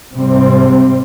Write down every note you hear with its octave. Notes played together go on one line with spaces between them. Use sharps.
G#2 C3 G3 C4